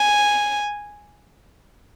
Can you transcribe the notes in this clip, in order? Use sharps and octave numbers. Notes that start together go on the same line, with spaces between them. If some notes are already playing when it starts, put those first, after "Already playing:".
Already playing: G#5